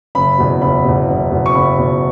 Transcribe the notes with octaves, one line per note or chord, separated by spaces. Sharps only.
F#1 B5
E2 B2
F#1 B5
E2 B2
F#1
E2 B2
C#6
F#1 B5
E2 B2